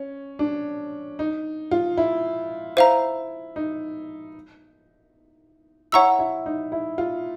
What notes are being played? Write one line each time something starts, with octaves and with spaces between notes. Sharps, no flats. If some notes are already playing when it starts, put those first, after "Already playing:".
Already playing: C#4
D4
D#4
F4
E4
E4 C5 F5 A#5
D#4
E4 C#5 F#5 A#5 C#6 E6
E4
D#4
E4
F4